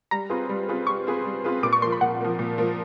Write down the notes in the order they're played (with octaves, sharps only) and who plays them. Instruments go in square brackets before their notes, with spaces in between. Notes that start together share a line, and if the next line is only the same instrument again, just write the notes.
[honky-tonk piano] G3 [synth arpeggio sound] A#5
[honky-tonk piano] C4 F4 G#4 B4
G3
C4 F4 G#4 B4
[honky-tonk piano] G3 [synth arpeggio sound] C#6
[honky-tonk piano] C4 F4 G#4 B4
G3
C4 F4 G#4 B4
[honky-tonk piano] A#2 [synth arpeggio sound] D6
[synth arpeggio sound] C#6
[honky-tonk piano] F3 A#3 [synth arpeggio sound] C6
[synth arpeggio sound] B5
[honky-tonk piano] A#2 [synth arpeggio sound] F#5
[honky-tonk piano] F3 A#3
A#2
F3 A#3